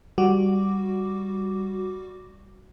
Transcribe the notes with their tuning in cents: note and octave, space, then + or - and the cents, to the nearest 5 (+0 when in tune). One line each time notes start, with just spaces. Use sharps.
G3 +0 F#4 +0 D6 +0